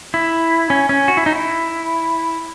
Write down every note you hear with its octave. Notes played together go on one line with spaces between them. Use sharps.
E4
C#4
C#4
F#4
E4
D#4
E4